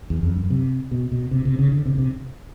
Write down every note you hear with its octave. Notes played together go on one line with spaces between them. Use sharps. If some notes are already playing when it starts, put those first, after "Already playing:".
E2
F2
F#2
C3
B2
B2
C3
C3
C#3
D3
C3
C#3
C3